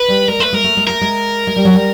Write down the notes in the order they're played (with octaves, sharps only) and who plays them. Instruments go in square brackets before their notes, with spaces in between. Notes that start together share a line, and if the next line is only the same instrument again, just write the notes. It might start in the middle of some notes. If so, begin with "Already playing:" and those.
Already playing: [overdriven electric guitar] B4
[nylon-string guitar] G3
[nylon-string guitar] G#3 [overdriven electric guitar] A#4
[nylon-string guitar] A3 [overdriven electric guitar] B4
[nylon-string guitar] G#3 [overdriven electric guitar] A#4
[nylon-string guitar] A3
G#3
[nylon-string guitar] A3 [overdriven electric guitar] A#4
[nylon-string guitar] G#3
G#3
G3
F#3
G3